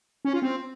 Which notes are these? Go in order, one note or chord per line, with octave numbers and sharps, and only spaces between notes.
C#4
F4
C4